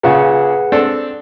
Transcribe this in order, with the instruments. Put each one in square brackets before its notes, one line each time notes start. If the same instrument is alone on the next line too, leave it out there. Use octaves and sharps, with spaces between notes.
[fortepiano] A#2 C#3 [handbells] G#4 B4 F#5
[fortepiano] C4 D4 A4